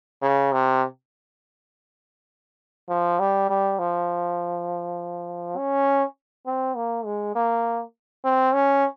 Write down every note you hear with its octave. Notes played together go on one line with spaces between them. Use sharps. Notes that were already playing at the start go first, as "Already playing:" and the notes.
C#3
C3
F3
G3
G3
F3
C#4
C4
A#3
G#3
A#3
C4
C#4